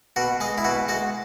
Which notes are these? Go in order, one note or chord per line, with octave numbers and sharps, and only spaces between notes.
B2 F#4
G#3 G#4
E4
B2 F#4
G#3 F#4